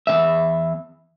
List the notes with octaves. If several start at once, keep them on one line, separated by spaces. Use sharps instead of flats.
E2 B2 E5